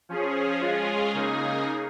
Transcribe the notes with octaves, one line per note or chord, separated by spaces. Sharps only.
F3 C#4 G#4
G#3 C#4 F4 G#4
C#3 A#3 D#4 G#4